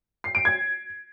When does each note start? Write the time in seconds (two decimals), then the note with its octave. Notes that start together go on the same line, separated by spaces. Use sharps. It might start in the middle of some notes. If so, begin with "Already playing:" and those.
0.24 C7
0.35 D7
0.45 G#6